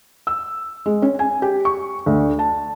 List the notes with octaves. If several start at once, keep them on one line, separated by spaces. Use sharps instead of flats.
E6
G#3
C#4
G#5
G4
C#6
D2
A5